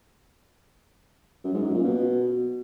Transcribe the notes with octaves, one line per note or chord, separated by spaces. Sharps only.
F#2
G#2
F#2
A#2
B2